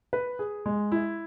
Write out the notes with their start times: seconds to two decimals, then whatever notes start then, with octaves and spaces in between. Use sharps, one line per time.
0.13 B4
0.39 G#4
0.66 G#3
0.92 E4